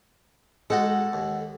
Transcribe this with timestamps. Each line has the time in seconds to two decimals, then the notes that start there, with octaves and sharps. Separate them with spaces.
0.70 G#3 D#4 F#4 A4 F#5
1.13 D#2